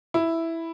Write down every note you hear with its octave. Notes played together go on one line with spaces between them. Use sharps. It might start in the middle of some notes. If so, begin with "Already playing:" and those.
E4